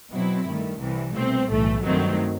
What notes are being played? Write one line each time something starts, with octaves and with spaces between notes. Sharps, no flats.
B2 F#3 C4 E4
G2 D#3 A3
C2 C3 E3
B2 A3 C4
B1 A2 E3 A3
G2 D#3 F#3 A3 C4